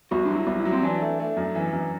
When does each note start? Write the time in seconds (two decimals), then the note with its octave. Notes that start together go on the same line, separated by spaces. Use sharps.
0.11 C2 F#4
0.25 F#3 D4
0.35 E4
0.47 C2
0.59 E4
0.65 F#3
0.72 C4
0.83 E3 D4
1.02 A3
1.20 A3
1.37 F#2
1.55 E3
1.73 F#2